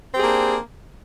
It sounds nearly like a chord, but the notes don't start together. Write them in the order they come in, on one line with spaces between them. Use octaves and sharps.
C4 G4 G#4 A#3 D4